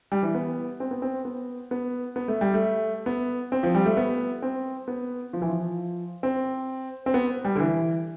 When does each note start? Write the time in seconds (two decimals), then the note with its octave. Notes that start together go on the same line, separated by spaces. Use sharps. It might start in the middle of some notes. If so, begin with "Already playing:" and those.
0.12 G3
0.23 E3
0.35 B3
0.80 C4
0.91 B3
1.02 C4
1.25 B3
1.71 B3
2.16 B3
2.28 A3
2.41 G3
2.54 A3
3.06 B3
3.52 C4
3.63 F3
3.75 G3
3.86 A3
3.97 B3
4.42 C4
4.88 B3
5.33 F3
5.42 E3
5.49 F3
6.23 C4
7.06 C4
7.14 B3
7.45 G3
7.56 D3
7.60 E3